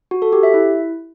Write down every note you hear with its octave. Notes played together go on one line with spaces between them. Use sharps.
F#4
A4
G4
E5
E4